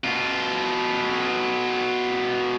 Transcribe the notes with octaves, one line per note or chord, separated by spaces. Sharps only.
B2 F4